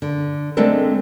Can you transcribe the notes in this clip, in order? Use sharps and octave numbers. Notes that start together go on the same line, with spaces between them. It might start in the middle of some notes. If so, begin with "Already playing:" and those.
D3
G#3 A3 C4 D4 A4 A#4